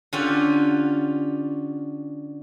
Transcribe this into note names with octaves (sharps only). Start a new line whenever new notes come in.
D3 C#4 F4 G4 F#5